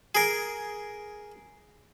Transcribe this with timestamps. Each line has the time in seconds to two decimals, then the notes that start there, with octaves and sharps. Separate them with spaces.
0.15 G#4 A#4